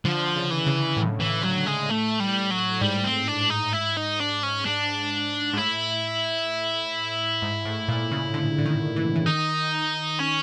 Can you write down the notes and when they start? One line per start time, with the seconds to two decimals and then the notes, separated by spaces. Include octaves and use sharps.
0.05 D3 F3
0.36 C#3
0.51 E3
0.66 C#3
0.97 A2
1.20 E3
1.43 F#3
1.66 G#3
1.90 A3
2.20 G3
2.51 F#3
2.81 G#2 G3
3.04 C4
3.28 D4
3.50 D#4
3.73 E4
3.96 D#4
4.20 D4
4.43 C#4
4.66 D4
5.53 G#2
5.57 A2 E4
7.42 G#2
7.65 A2
7.88 A#2
8.11 C#3
8.34 D3
8.58 D3
8.65 D#3
8.96 E3
9.16 E3
9.26 D#3 D#4
10.19 C#4